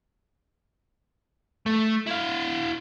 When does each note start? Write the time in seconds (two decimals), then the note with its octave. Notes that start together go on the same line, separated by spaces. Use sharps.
1.66 A3
2.06 E4 F5